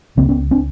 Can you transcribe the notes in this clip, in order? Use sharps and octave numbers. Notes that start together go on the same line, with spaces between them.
C#2 C#3 A#3 C4
B3 C#4
C4 D4